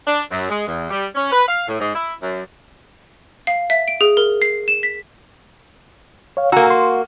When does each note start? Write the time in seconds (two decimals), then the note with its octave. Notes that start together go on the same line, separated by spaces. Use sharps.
0.07 D4
0.31 F#2
0.50 G#3
0.67 E2
0.90 G3
1.15 C#4
1.32 B4
1.48 F5
1.68 A2
1.80 G#2
1.95 E4
2.22 F#2
3.47 F5
3.70 E5
3.88 D7
4.01 G#4
4.17 A#4
4.42 C7
4.68 E7
4.83 B6
6.37 C#5 F5
6.52 A#3 F#4 G#5 A#5 E6
6.70 C6